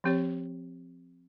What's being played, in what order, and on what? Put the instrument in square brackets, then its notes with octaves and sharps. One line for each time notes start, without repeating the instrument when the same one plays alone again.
[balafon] F3 C4 G4 C#5